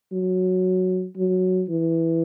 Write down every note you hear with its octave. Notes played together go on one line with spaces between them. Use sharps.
F#3
F#3
E3